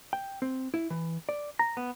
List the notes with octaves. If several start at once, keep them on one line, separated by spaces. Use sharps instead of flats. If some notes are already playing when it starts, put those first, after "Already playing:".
G5
C4
E4
E3
D5
A#5
B3